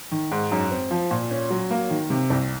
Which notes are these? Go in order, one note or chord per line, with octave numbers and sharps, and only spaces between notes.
D#3
G#2
F#2
C4
F3
A#2
C#4
F#3
A#3
D#3
C3
C2